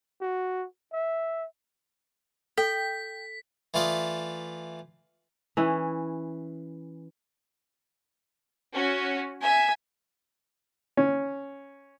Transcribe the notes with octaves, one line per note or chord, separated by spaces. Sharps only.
F#4
E5
A4 G5 B6
E3 A3 F4 D5 D#6
E3 C#4 E4
C#4 F#4
E5 G#5
C#4